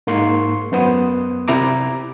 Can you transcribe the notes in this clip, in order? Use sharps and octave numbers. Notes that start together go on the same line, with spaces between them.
G#2 A#3 C6 C#6
F#2 B3 C5 D#6
C3 E4 A#5 D6